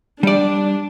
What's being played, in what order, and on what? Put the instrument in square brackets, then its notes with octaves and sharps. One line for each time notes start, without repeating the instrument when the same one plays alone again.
[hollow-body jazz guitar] G3 D5 [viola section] D4